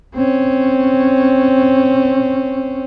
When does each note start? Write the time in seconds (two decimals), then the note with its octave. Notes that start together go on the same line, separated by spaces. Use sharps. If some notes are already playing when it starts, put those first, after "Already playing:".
0.15 C4 C#4